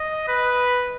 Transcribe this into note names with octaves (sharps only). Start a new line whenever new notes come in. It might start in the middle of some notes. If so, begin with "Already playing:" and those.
Already playing: D#5
B4